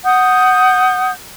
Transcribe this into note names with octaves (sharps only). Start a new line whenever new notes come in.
F#5 D#6 G6